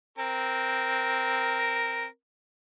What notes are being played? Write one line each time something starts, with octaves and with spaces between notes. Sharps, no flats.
C4 A#4